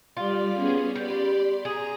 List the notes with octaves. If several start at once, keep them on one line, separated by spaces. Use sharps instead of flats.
G3 F4 D5 D6
B3 C#4 G#4
G4 D5 B5 C6
G#4 A#5